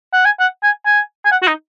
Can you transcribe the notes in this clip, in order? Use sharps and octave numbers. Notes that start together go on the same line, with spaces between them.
F#5
G#5
F#5
G#5
G#5
G#5
F#5
F#4
D#4